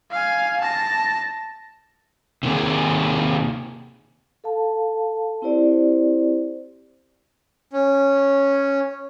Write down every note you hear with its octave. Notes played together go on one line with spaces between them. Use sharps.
F5 G#5
A5 A#6
C3 D#3 A#3 G#4
A4 F5 A5
C4 E4 G4 C5 D5
C#4